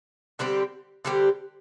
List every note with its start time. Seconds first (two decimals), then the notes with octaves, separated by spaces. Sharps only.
0.39 D3 G3 C4 G4
1.05 D3 G3 C4 G4